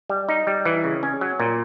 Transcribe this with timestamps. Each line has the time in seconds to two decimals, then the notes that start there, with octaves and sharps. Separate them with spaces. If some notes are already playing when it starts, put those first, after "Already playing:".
0.10 G3
0.29 D#4
0.47 G3
0.65 E3
0.84 C#3
1.03 C#4
1.21 F#3
1.40 A#2